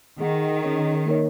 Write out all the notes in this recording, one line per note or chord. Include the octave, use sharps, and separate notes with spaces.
D#3 G#4 F#5
C#4 G#4 C#5
A#3 D#4 A#4 C#5